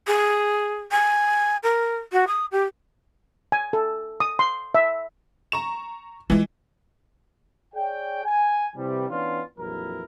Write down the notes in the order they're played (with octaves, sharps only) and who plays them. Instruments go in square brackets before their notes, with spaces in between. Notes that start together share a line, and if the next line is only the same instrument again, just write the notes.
[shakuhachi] G#4
G#5
A#4
F#4
D#6
G4
[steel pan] G#5
A4
D#6
C6
E5
[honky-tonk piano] A#5 C#6 E7
[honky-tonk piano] E3 [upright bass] G#3 F4
[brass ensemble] G#4 C#5 D5 G5
G#5
C3 E3 G3
E3 B3 C#4 D4 F4
A#1 F2 E3 F#3 E4 A#4